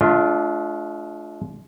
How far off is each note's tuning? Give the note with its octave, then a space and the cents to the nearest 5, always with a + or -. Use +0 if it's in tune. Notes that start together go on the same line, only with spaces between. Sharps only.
A3 -45 D4 +0 F4 +0